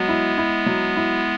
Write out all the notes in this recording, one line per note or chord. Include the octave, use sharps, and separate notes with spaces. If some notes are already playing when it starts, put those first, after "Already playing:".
Already playing: F#3 G#3 B3
E4
E4
F#3
E4